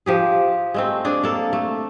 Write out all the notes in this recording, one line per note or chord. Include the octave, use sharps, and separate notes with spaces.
F3 G4 G#4
G#3 A3 C4
D4 G#4
A#3 A4
A3